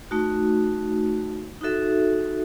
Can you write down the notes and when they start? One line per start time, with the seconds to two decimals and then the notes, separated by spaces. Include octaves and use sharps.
0.11 A3 D#4 F#4
1.61 D#4 F#4 A4 E5